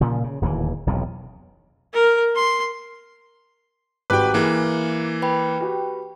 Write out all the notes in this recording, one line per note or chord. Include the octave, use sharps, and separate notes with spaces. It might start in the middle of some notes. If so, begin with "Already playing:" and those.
A#2 C#3 F3
C#3
D1 D#2 D#3 E3
E1 B1 F2 C3
A#4
C6
G#1 G3 F#4 B4 G5 D6 F#6
E3 A#3 G#4
B4 G5 B5
F#4 G4